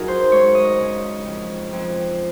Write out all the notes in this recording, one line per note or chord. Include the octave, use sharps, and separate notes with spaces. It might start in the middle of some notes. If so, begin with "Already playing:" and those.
Already playing: F#2 D#4 F#4 G#4 A#4
C5
G#3 C#5
D#5
C#3
F2
F2